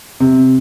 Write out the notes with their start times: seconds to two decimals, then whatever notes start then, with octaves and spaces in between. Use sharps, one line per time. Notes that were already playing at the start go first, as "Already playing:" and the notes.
0.20 C3